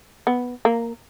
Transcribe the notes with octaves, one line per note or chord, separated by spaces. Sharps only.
B3
A#3